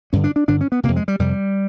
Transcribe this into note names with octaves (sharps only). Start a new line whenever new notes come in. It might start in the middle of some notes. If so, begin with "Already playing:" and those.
G2 D3 C#4
D4
D4
G2 D3 D4
C#4
B3
F2 C3 A#3
G#3
G3
F2 C3 G3